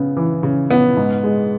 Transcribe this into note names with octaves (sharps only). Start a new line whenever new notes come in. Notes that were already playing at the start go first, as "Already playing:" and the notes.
Already playing: C#3 B3
E3
C#3
B3
G#2
G#3